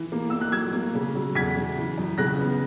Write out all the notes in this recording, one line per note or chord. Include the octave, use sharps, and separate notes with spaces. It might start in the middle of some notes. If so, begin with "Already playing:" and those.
Already playing: E3
A#3
A#3 E6
F#6
F#3 E6 G#6
A#3
C#3
F#3
E2 G#6 B6
C#3
E3
F#2
C#3 F#6 A#6
B3